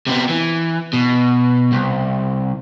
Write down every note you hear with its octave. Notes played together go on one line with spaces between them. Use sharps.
C3 B3
E3
B2
C2